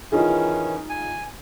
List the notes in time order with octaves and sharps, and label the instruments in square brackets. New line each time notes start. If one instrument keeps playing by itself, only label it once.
[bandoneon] D#3 E3 C#4 [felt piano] D#4 F4 G#4
[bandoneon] G#5